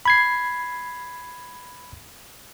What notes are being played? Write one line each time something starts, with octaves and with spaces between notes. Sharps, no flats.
B5 G#6 C7